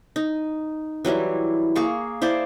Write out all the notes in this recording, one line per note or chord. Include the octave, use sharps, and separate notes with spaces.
D#4
E3 F#3 G3 E4
A#3 G#4 F5 C#6
E4 C5 D5 F5